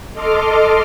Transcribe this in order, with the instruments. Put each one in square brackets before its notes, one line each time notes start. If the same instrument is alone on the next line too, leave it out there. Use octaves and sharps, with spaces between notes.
[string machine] A4 D#5 C6 D6 F6